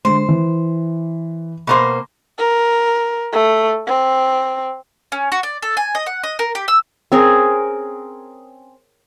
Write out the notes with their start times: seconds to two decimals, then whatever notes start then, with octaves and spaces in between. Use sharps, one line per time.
0.05 D3 G#3 C5
0.29 E3
1.67 B2 A#3 C5
2.38 A#4
3.33 A3
3.87 C4
5.12 C#4
5.32 F#4
5.43 D5
5.62 A4
5.77 G#5
5.95 D#5
6.06 F#5
6.23 D#5
6.39 A#4
6.55 G4
6.68 E6
7.12 C4 C#4 G#4 A#4